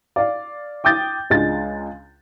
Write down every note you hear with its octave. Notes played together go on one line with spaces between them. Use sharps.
D5 F5
G5 D6 D#6 G6 A6
C#2 G#3 D4 F4 A6